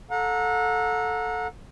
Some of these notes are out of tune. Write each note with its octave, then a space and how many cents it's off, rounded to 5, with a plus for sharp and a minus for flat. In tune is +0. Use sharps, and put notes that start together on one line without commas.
A4 +0 F#5 -35 A#5 +0